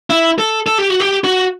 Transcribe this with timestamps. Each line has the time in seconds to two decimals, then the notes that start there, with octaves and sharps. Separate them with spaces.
0.10 E4
0.38 A4
0.67 A4
0.78 G4
0.90 F#4
1.00 G4
1.24 F#4